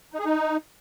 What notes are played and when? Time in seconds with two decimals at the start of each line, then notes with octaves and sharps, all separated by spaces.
0.13 D#4
0.19 G#4
0.25 D#4